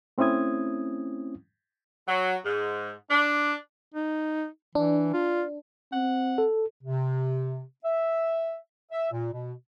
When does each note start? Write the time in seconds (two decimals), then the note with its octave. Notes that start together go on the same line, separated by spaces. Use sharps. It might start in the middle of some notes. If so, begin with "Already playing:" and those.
0.18 A3 C4 C#4 E4 D#6 G#6
2.08 F#3
2.45 G#2
3.10 D4
3.95 D#4
4.75 E3 D4
5.13 F4
5.92 C4 F#5
6.38 A4
6.83 C3
7.84 E5
8.91 E5
9.11 A#2
9.32 B2